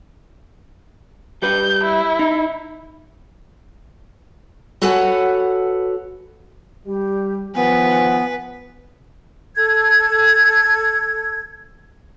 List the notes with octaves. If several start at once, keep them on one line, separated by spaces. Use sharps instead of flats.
G3 G4 B4 G6
E4
D#4
F#4 A4 B4 C#5 F#5 G#5
G3 G4
D#3 F3 B3 B4 G#5
A4 G#6